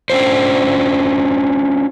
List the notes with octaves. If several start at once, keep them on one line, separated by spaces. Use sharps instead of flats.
C#4 D4 F4 C5